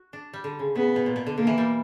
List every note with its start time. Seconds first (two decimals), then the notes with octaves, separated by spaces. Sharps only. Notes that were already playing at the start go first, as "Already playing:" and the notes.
Already playing: F#4
0.13 D4
0.33 G3
0.44 D3
0.59 C#3
0.76 C#3 B3
0.96 B2
1.06 A#2
1.16 B2
1.26 D3
1.38 D3 A#3
1.47 E3
1.58 G3